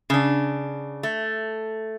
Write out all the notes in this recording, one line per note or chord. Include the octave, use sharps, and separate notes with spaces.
C#3 D4
A3